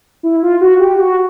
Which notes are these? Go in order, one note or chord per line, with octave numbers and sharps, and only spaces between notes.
E4
F4
F#4
G4
F#4